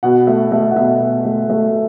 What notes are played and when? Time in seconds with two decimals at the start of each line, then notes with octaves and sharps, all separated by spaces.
0.03 B2 F#5
0.27 A3 E5
0.52 A3 E5
0.71 F#5
0.76 B2 E5
1.00 B2
1.25 A3
1.50 A3